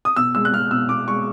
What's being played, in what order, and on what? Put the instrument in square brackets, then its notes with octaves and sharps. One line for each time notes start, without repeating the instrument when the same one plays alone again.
[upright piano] D#6
B2 E6
G#3 E6
F#6
G#3 F6
B2 E6
B2 D6
G#3 C#6